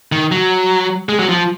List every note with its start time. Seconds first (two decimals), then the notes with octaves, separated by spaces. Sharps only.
0.12 D#3
0.32 F#3
1.09 G#3
1.19 F#3
1.29 F3